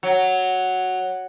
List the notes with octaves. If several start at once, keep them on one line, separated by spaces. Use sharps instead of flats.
F#3